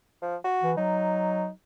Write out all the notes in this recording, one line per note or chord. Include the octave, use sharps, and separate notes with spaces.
F3
F#4
E3
F#3 D#4